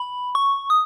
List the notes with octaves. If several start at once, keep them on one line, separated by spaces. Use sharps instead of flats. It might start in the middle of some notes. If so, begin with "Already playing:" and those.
Already playing: B5
C#6
D#6